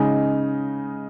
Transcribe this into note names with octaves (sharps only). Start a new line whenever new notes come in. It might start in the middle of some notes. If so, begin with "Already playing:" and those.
Already playing: C#3 G#3 D#4